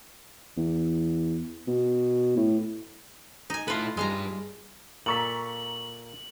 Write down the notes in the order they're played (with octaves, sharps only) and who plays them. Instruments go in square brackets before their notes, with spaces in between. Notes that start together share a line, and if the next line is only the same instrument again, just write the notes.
[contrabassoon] E2
B2
A2
[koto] D#4 G#5
[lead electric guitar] E4 A4 [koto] F4 B4
[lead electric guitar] G2 G3 [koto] G#3 F5 A#5
[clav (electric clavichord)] A#2 A4 [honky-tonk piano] A#5 C#6 B6 [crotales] F#7